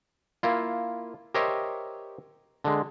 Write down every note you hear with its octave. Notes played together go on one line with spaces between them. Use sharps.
A#3 E4 F4
G4 A#4 C5 C#5 D#5 E5
D3 G#3